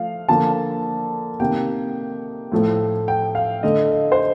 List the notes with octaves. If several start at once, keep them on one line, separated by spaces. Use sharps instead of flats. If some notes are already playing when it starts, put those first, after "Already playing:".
Already playing: F3 A3 F5
D3 F3 A#3 A5
C3 D#3 A#3 G5
A2 F3 A3
G5
F5
D3 A3 D#5
D#5
C5